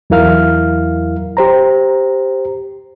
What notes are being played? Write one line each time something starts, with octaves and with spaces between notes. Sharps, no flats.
E2 F#3 E4 A#4 F5 F6
G4 C5 A#5